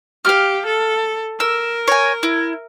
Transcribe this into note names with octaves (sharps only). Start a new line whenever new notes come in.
G4 F5 F6
A4
A#4 E6
C#5 G#5
E4